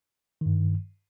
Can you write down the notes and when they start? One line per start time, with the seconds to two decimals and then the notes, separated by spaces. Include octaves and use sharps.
0.41 G2 D#3